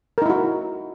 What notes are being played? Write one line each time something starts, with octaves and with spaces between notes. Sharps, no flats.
D#4 E4 F#4 A#4